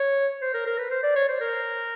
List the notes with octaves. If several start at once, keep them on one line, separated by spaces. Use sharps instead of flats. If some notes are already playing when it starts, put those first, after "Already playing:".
Already playing: C#5
C5
A#4
A#4
B4
C5
D5
C#5
C5
A#4